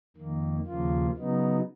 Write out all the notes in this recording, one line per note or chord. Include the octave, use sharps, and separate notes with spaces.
F2 D#3 A#3
D#2 C#3 F3 A#3 F4
C#3 F#3 B3 D#4